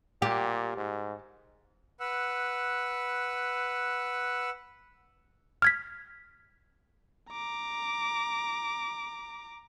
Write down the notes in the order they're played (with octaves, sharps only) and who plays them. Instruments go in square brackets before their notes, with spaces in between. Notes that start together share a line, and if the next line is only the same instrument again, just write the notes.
[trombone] A#2 [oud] G4
[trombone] G#2
[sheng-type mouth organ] B4 F#5 E6
[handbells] F6 G#6 B6
[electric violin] A#5 D6